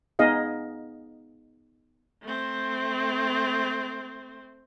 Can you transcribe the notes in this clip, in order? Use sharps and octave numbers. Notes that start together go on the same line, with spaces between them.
B3 D#4 G#4 D#5 F5
A3 C4